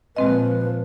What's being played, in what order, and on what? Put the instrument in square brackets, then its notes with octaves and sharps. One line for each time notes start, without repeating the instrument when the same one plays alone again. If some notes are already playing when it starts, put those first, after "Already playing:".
[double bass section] A#2 F3 [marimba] G#3 C4 D#5 [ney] B4